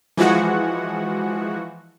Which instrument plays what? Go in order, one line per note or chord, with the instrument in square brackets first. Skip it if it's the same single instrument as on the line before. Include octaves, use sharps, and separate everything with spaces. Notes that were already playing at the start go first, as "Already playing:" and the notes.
[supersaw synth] E3 F3 G#3 F#4 F#5